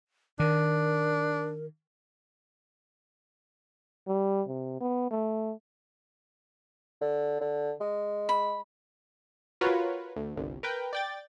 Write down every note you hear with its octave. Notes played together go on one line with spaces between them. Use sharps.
D#3 D4 A#4
G3
C3
B3
A3
D3
D3
G#3
B5
F4 F#4 A#4 B4 C#5
D2
G1 C2
A#4 B4 G5
D5 G5 A6